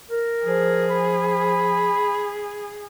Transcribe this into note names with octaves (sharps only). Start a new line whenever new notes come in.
A#4
F3 G#4
B5